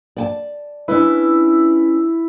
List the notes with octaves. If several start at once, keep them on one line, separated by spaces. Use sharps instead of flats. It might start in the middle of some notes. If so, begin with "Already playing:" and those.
D5 G5 A5
C#4 D4 E4 B4